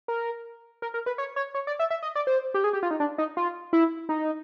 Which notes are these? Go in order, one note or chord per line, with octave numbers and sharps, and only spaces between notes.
A#4
A#4
A#4
B4
C#5
C#5
C#5
D5
E5
E5
D#5
D5
C5
G4
G#4
G4
F4
D#4
D4
D#4
F4
E4
D#4